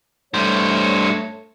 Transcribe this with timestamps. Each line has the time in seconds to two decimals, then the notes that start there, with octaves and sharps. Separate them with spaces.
0.34 G2 A3 C5 C#5